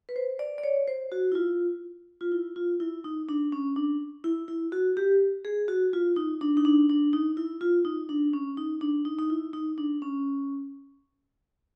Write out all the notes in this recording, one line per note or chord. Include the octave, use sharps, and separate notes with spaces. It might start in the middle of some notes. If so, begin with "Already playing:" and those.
B4
C5
D5
D5
C#5
C5
F#4
E4
F4
F4
E4
F4
E4
D#4
D4
C#4
D4
E4
E4
F#4
G4
G#4
F#4
F4
D#4
D4
D#4
D4
D4
D#4
E4
F4
D#4
D4
C#4
D#4
D4
D#4
D#4
E4
D#4
D4
C#4